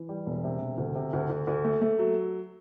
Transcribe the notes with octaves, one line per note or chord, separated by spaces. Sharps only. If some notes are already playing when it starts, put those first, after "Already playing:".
Already playing: E3
G3
E1
C3
E1
D2
C3
D2
D2
D2
A3
A3
F#3